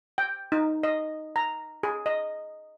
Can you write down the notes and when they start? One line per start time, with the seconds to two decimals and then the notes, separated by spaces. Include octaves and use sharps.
0.18 G5
0.52 D#4
0.83 D#5
1.36 A#5
1.83 G#4
2.06 D#5